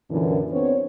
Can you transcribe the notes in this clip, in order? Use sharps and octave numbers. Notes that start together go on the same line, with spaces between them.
F#2 A#2 D3 E3
B3 C4 D4 B4 C#5